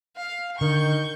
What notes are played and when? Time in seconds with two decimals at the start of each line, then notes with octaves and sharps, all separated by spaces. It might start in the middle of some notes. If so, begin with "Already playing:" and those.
0.20 F5
0.61 D3 D#3 C#6 G6